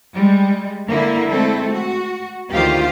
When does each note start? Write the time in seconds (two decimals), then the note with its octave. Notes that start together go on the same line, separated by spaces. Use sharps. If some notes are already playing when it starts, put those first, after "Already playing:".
0.13 G3 G#3
0.87 D3 A#3 E4
1.30 G#3 A3 C4 E4 A4
1.72 F#4
2.52 D2 D#3 F4 G4 C5 F5